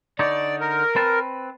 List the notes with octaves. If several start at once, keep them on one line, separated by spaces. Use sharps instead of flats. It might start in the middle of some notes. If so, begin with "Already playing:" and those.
D3 D#4 C#5 D5
A#4
C4 B4 A5